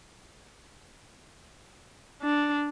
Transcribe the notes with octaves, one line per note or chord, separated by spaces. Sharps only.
D4